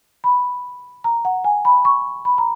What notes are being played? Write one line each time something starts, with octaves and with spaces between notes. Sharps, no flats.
B5
A#5
F#5
G#5
B5
C#6
B5
A#5